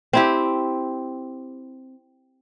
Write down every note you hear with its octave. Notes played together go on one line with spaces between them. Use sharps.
C4 E4 G4